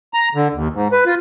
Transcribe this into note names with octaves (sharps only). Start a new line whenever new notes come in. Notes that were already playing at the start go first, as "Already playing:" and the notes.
A#5
D3
D#2
G#2
B4
F4